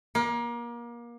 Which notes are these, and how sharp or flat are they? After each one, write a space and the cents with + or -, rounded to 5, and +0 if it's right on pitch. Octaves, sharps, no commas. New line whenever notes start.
A#3 +30